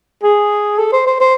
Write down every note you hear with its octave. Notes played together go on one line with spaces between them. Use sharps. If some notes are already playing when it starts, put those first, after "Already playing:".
G#4
A4
C5
C5
C5